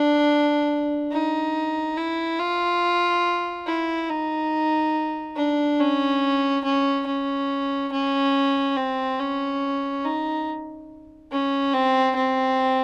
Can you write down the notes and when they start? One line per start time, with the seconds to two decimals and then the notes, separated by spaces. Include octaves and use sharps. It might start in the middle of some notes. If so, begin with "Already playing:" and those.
Already playing: D4
1.12 D#4
1.98 E4
2.40 F4
3.67 E4
4.10 D#4
5.37 D4
5.80 C#4
6.64 C#4
7.07 C#4
7.92 C#4
8.77 C4
9.20 C#4
10.05 D#4
11.32 C#4
11.74 C4
12.16 C4